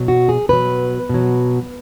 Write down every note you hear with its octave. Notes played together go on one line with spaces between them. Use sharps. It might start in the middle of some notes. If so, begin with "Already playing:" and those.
Already playing: B2 F#3
F#4
G#4
B2 F#3 B4
B2 F#3